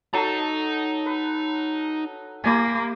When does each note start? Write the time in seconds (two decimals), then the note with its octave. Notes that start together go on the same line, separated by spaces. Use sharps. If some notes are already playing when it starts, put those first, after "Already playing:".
0.14 F#3 D#4 A4 A5 A#5
1.06 B4
2.44 A#3 E4 G4 G#5